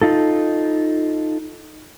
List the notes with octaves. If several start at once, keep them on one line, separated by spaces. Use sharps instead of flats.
D#4 F4 A4